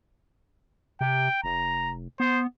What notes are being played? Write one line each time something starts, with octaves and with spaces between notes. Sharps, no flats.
C3 G5
F1 A#5
B3 C5